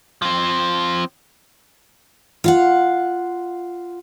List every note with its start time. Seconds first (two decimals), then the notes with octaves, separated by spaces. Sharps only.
0.22 F3 C4
2.44 F4 F5 F#5